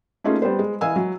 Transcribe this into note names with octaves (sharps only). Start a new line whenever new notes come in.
A3 A#3 C#4 D#4 F4 G#4
G3 B3 C5
G#3
E3 D#5 F5 G#5 E6
F#3